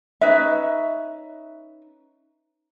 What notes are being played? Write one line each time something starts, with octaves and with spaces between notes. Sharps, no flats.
C#4 D#4 B4 E5